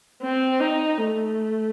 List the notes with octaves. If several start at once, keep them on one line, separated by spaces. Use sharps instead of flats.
C4
D#4
A3